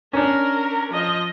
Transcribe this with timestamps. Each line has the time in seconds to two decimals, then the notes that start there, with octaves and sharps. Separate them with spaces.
0.13 C#4 D4 A#4
0.91 F3 D#5